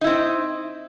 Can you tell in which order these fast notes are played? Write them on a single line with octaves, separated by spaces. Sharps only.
D#4 E4 C4